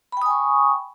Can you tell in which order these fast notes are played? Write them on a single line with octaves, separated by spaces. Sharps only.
B5 G5 D#6 G#5 C#6